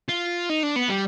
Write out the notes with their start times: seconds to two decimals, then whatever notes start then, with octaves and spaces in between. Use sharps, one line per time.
0.09 F4
0.49 D#4
0.63 D4
0.76 B3
0.89 G3